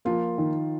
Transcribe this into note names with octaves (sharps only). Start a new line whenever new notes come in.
F3 A#3 F4
D#3